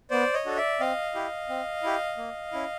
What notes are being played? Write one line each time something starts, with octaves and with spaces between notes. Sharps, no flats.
B3 C5 D5
C#5 D#5
D4 F#4 A4
D5 E5
C4 D#5 F5
E4 G4
C4
E4 G4
A#3
C#4 E4